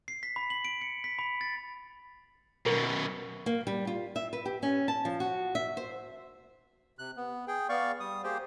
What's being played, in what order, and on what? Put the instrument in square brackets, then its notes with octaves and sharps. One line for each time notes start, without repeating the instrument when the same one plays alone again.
[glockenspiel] C7
B6
B5
F#7
D7
C#7
B6
B5
A6
[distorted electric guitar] F#2 B2 [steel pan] A#4
[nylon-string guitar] A#3
G3
F4
E5
B4
G4
C#4
A5
F3
F#4
E5
C5
[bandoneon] C3 F#6
B3
G#4 G5
B3 D5 F5 C#6
G3 D#6
A#3 G4 G#4 C5 G5